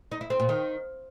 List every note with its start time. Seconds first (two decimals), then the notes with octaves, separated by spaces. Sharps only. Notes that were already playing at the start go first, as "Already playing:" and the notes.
0.11 D#4
0.21 E4
0.30 C4
0.40 A#2
0.49 D#3